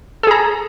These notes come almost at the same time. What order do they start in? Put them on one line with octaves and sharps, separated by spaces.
A4 G#4 A#5